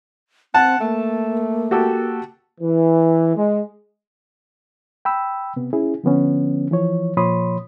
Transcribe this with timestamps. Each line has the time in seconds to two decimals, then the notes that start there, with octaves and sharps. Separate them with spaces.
0.54 C4 F#5 A5
0.80 A3 A#3
1.71 F#4 G4 A4
2.61 E3
3.36 G#3
5.05 G5 B5 E6
5.56 C3 B3
5.73 C#4 E4 G#4
6.04 D3 F3 B3 C#4
6.71 E3 F3 C#5
7.17 A#2 F3 C#5 B5 C6 D#6